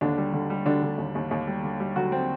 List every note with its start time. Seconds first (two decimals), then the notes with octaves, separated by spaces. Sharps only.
0.01 D#2 D3 D4
0.18 G3
0.33 D3
0.50 G3
0.65 D3 D4
0.82 D3
0.98 D#2
1.15 D#2
1.31 D#2
1.47 G3
1.63 D3
1.80 G3
1.96 D3 F#3 F#4
2.12 G3 C4